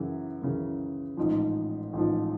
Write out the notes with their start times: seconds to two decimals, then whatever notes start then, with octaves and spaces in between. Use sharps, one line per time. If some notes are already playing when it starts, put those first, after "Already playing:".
Already playing: F#2 C#3 E3
0.42 F#2 C#3 E3
1.17 A1 G#2 F3
1.93 A1 G#2 F3